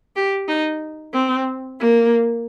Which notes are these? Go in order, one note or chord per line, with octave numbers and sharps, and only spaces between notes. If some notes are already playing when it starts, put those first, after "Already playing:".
G4
D#4
C4
A#3